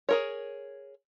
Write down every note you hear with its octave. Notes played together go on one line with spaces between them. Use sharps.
G#4 A#4 C#5